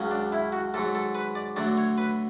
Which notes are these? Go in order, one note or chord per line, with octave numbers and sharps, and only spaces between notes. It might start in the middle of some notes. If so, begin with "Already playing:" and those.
Already playing: C#2 C#3 F#3
D4
E4
F#4
G#2 F#3 A4
A4
B4
D5
D2 D3 F#3 D5
C#5
B4